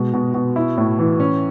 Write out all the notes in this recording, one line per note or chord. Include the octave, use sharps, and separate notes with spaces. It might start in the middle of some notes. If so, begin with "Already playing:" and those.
Already playing: B2 G#3
B2
B2
E4
A2
E3
C#4